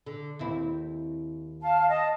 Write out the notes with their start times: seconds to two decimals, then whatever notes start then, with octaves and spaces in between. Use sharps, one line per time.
0.07 D3
0.39 D#2 C4 E4
1.62 F5 A5
1.88 D#5 A5